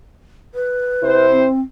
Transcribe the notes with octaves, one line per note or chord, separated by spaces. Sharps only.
B4
C3 E4 C5
C4